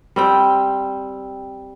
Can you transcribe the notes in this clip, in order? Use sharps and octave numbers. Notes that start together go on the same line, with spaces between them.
G3 C4 G5